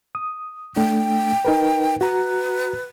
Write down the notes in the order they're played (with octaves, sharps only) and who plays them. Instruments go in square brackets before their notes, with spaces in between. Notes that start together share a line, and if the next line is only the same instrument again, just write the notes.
[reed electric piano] D#6
[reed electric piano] A3 D4 [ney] G5
[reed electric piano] D#4 A#4 B4
[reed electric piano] F#4 A#5 [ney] B4